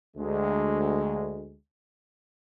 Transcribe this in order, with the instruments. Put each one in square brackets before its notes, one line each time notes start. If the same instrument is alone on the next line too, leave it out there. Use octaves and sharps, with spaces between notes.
[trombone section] D2 G#3